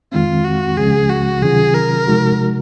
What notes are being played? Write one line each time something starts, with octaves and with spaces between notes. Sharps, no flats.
F2 D#3 G#3 C4 F4
F#4
C#2 C#3 F3 G#3 C#4 G#4
F#4
C3 D#3 F#3 C#4 F4 G#4
A#4
C3 F3 G#3 D#4 F#4